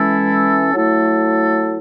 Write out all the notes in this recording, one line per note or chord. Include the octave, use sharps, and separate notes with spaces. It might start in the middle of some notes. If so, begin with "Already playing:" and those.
Already playing: E3 G#3 C#4 E4 A4
F#3 A3 E4 A4